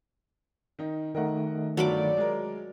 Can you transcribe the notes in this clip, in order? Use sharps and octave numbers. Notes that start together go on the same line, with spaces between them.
D#3 D#4
D#3 A3 A#4 D#5 F#5
G1 F#3 F4 A4 D5 B5 D6
G#3 A#4